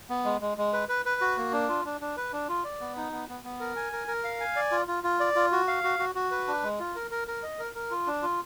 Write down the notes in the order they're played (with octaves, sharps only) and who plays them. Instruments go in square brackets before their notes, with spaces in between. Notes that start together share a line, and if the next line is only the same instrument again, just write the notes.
[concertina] B3
G#3
G#3
G#3
B4
B4
B4
F#4
A#3
D4
F4
D4
D4
B4
D4
F4
D5
B3
D#4
B3
B3
B3
A#4
G#5
A#4
A#4
F5
G#5
D5
F4
F4
F4
D5
F4
F#4
F5
F#4
F#4
F#4
B4
D4
G#3
F4
A#4
A#4
A#4
D#5
A#4
A#4
F4
D4
F4